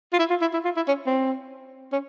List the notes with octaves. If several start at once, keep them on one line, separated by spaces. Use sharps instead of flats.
F4
E4
F4
E4
E4
F4
E4
C#4
C4
C#4